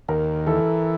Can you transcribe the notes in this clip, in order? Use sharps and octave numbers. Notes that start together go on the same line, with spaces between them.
D#2 A#4
E3 A4